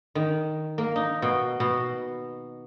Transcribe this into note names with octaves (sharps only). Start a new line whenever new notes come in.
D#3
A#3
D#4
B2
B2